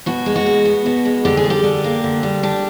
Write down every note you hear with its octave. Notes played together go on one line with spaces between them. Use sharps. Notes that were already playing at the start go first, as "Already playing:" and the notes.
B2 F#4
G#3
F#4
B2
B3
B2
G#3
D3 G4
G#4
G3
G4
D3
A#3
D3
G3
D4 G4